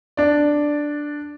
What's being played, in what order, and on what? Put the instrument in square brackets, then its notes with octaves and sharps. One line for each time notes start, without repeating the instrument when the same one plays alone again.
[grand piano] D4 D5